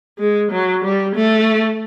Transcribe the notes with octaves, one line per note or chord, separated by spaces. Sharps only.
G#3
F#3
G3
A3